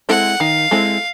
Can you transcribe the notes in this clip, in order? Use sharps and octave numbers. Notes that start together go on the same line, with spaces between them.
G#3 C4 E4 A4 F#5
D#3 F5
G#3 C4 E4 A4